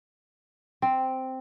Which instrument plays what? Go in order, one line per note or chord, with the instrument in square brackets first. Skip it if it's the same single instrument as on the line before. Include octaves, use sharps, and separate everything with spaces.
[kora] C4